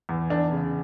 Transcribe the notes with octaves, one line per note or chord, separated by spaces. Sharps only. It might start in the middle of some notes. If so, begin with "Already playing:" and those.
E2
E2 D4
C#3